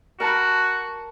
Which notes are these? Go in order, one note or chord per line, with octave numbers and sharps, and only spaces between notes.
F#4 A#4 A5 B5